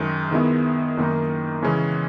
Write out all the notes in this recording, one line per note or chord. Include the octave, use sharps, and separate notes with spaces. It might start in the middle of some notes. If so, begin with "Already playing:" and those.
Already playing: F#2 D#3 G#3
D#3 G#3 B3 E4
F#2 D#3 A#3 D#4
C#3 E3 G#3 C#4